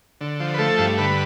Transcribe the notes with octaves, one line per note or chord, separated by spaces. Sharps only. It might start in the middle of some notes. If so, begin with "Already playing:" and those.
D3
F3
B4
A3 A4
G2
D3 B4